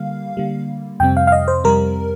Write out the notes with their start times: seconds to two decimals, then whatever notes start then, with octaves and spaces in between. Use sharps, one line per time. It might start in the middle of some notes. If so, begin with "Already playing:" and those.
Already playing: D3 G3 A#3 F5
0.37 D3 G3 A#3
1.00 F2 C3 G3 C4 G5
1.17 F5
1.27 F5
1.32 D#5
1.48 C5
1.64 F2 C3 G3 C4 A#4